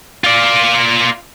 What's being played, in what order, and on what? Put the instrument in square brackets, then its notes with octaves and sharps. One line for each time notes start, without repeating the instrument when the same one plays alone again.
[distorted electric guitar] F4 D5